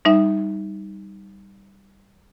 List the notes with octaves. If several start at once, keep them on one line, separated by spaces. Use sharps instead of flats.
G3 D#4 E5